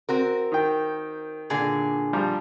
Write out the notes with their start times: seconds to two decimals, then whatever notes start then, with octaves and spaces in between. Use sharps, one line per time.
0.09 C4 F#4 A#4
0.52 D#3 G5
1.50 A#2 D3 G#4
2.13 F3 G3 A#5